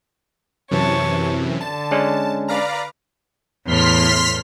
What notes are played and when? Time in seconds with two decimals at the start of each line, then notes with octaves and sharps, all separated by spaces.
0.71 F#2 C3 E3 C#5 A5
1.61 D3 A5
1.91 G#3 C#4 D4
2.48 B4 D5 F5 A#5
3.66 E2 A2 C6 F6 B6